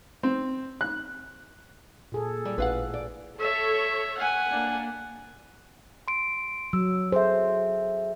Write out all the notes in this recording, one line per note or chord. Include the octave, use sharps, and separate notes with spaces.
C4
F#6
A#2 G#4 A4
G3
A1 B4 F5 F#5
D5
A4 C#5 E5
F#5 G#5
A#3 D4
C6 D7
F#3 E6
G#4 A4 C5 E5